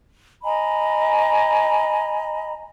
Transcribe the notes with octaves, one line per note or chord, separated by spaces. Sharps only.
D#5 G#5 A#5 B5